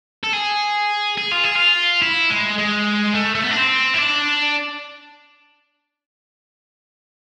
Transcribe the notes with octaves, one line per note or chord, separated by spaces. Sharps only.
A4
G#4
G#4
F4
G#4
F4
E4
G#3
G#3
A3
A3
B3
D4
C4
E4
D4